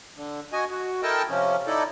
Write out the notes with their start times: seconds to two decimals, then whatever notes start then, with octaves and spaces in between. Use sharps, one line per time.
0.16 D3
0.53 F#4 D#5 G#5
0.71 F#4
1.03 E4 A4 A#4 D#5 G5 A5
1.30 C3 F3 C#4
1.67 D#4 E4 A4 D5